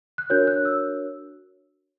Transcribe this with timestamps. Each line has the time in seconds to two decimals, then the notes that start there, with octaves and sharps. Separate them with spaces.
0.18 F#6
0.30 D4 F#4 A#4 C#5 G6
0.47 F#6
0.65 E6